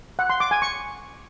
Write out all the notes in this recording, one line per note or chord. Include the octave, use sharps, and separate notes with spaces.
F#5
C6
D6
G#5
C#6